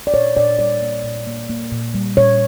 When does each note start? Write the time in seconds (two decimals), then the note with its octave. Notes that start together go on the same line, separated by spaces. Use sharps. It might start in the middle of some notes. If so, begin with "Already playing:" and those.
0.07 D5
0.14 A#2 C#5
0.37 A#2 D5
0.59 G3 D5
0.81 A#3
1.04 A#2
1.27 A#3
1.49 A#3
1.72 A#2
1.94 G3
2.17 A#2 C#5